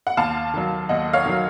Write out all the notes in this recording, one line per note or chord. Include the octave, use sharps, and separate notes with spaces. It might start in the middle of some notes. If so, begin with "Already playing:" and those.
F#5
D#2 F5 A5
D#3 F#3
D#2 D#5 F#5
C#5 F5
D#3 F#3